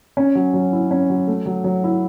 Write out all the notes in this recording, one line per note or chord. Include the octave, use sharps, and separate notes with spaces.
C#4
F#3
F#3
E4
C#4
F#3
A3
F#3
F#3
E4